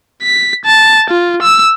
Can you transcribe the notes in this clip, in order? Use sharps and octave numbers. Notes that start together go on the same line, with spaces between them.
B6
A5
F4
E6